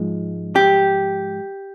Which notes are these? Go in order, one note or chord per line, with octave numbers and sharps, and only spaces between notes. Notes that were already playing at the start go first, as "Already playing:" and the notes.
Already playing: G#2 F3 G#3
G4